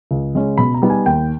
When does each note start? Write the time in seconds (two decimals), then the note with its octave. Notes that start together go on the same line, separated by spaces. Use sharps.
0.11 C#2
0.35 C#3 G#3 C#4
0.58 B2 B5
0.74 A#5
0.82 G3 B3 D#4
0.90 G#5
1.06 D#2 G5